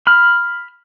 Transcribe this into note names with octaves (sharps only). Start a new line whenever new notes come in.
B5 F6